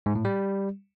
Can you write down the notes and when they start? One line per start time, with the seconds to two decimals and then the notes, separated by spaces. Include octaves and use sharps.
0.06 G#2
0.15 A2
0.25 G3